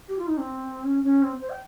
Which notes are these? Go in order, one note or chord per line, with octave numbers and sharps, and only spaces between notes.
G4
F4
D#4
C4
C#4
C#4
C4
C5
G5